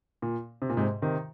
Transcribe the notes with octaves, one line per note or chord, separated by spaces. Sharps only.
A#2
C3
A#2
G#2 C3
C3 D#3